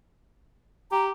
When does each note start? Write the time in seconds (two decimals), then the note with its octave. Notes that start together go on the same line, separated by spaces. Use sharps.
0.92 G4 A#5